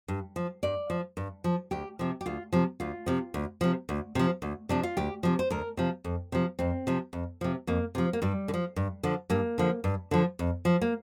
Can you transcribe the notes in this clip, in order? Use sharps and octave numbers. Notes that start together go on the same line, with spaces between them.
G2
F3
G2 D5
F3
G2
F3
D2 G4
C3 F3
G4
D2 F4
C3 F3
D2 F4
C3 F3
D2
C3 F3
D2
C3 F3
D2
C3 F3 D4
F4
D2 G4
C3 F3
C5
D2 A#4
C3 F3
F2
C3 F3
F2 C4
C3 F3
F2
C3 F3
F2 A#3
C3 F3
A#3
G2 G3
D3
F3
G2
D3 F3
G2 A#3
D3 F3
G2
D3 F3
F2
F3
A#3